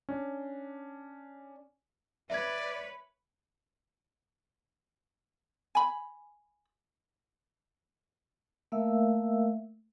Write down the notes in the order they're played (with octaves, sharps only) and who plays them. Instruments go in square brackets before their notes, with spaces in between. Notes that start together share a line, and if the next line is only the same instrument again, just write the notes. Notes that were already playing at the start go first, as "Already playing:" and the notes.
[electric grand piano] C#4 D4
[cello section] B4 C#5 [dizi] D5 [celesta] E5 G#6
[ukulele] G#5 B5
[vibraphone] A3 A#3 A#4 E5 F5 E6